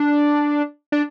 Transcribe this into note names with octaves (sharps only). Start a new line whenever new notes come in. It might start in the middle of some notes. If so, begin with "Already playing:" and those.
Already playing: D4
D4